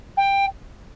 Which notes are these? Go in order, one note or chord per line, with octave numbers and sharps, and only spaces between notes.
G5